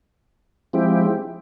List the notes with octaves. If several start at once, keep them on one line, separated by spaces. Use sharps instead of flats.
F3 G#3 C4 E4 G4